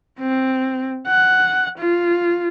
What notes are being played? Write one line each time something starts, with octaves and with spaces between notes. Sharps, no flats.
C4
F#5
F4